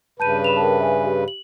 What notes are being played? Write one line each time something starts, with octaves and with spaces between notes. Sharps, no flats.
G2 C#3 B4 A5 G6 D#7
B5 E7 F7
A#4 G5 A5
E5 G#5
G4
F#7